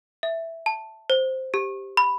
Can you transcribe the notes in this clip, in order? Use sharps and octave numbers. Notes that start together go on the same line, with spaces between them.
E5
A5
C5
G4
B5